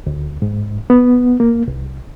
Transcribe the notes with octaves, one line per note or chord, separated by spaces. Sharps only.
D2
G#2
B3
A#3
C2